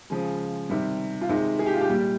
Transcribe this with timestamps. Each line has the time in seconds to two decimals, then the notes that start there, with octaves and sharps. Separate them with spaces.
0.10 C#3 F3 G#3
0.70 C3 D#3 G3
1.21 F4
1.29 C3 D#3 G#3 D#4
1.59 G#4
1.66 G4
1.74 F4
1.81 G4
1.89 A#2 G3